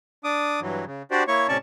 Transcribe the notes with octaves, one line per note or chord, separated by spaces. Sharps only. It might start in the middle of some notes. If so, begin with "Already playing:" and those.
D4 D6 D#6
G2 E3 F#3
C#3
D4 F#4 G4 C5 D5
A#3 E4 C#5 C#6
A2 C3 C#4 D5 A5 C#6